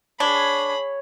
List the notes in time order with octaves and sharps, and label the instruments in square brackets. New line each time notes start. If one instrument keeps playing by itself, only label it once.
[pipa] D4 [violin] G#4 B5 [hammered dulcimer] C#5